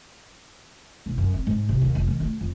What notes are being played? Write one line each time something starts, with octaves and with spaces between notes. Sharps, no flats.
E1
F#2
C4
G#2
C3
D#2
F1
D#3
D2
F2